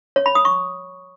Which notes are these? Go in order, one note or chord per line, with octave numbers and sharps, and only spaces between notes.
C#5
B5
D#6
C#6